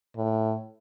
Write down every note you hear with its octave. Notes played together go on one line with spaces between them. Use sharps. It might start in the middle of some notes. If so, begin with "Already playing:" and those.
A2